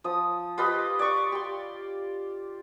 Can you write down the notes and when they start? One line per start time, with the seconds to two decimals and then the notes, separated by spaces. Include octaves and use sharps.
0.04 F3 D#6
0.58 F4 G4 B4 D#5
0.99 D5 C#6
1.32 G4 C6